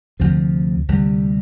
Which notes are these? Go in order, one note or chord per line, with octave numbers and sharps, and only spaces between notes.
D2 C3 F3
D2 C3 G3